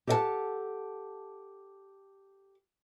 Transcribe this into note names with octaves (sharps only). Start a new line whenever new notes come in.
G4 A4 D#5 F5 F#5 A5